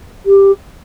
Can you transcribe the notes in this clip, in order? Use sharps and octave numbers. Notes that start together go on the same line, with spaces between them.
G4